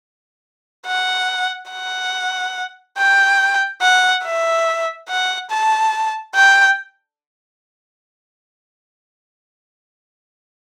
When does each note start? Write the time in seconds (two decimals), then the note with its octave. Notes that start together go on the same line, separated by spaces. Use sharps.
0.87 F#5
1.71 F#5
2.98 G5
3.81 F#5
4.24 E5
5.09 F#5
5.50 A5
6.35 G5